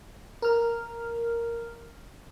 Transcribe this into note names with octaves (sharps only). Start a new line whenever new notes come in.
A#4 F6